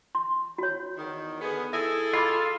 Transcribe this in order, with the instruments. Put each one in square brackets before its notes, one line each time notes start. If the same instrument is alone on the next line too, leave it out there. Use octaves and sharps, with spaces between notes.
[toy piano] C6
F#4 C#5
[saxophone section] E2 D#3
[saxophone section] D3 D#3 B3 [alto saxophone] G#4
[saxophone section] E4 G#4 [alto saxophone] A4 [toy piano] E5
[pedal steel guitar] F4 [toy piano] D#5 B5 D6